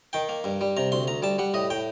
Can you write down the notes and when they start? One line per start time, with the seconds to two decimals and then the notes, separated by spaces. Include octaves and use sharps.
0.13 D#3 G5
0.29 A#3
0.44 G2
0.61 G3
0.77 C3 A#5
0.92 D2 C6
1.08 D2 A#5
1.22 G3 A5
1.38 G3 F#5
1.54 A2 D#5
1.70 A2 G5